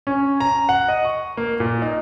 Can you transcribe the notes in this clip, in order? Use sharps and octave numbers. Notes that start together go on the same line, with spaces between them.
C#4
A#5
F#5
D#5
C#6
A#3
A#2
D#4